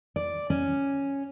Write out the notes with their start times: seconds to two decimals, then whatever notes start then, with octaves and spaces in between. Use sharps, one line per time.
0.16 D5
0.50 C#4